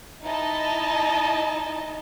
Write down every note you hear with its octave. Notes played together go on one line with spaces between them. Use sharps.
D#4 E4 D#5 A5